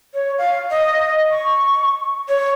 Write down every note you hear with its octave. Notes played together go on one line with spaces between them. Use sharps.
C#5
F5
D#5
C#6
C#5